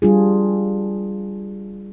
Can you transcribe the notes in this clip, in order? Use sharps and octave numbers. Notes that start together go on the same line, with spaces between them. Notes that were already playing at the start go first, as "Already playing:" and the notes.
G3 D4 F4 G#4